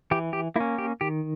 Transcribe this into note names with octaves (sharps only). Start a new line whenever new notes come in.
E3 G4
G4
A#3 C#4 E4
G4
D#3 G4